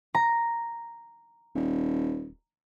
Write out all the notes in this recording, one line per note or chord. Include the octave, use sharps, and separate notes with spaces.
A#5
D#1